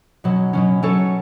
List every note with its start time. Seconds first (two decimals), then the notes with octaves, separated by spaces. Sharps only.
0.24 B2 F#3 C#4
0.53 B2 F#3 C#4
0.83 F#3 C#4 A4 C#5